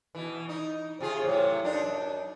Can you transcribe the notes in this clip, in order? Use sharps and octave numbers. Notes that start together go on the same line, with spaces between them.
B2 E3
D#4
C3 F4 G#4
A2 C3 F#3
F#2 D4 D#4